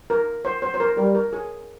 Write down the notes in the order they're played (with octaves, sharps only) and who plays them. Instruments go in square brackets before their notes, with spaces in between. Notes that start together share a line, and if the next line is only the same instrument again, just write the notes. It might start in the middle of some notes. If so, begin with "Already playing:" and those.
[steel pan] A#4
C5
C5
C5
A#4
[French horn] G3 [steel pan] A#4
[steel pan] A#4
G#4